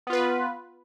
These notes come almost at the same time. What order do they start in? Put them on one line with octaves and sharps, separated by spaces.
B3 F4 B4